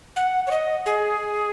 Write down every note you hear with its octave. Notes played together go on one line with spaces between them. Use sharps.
F#5
C#5
D#5
G#4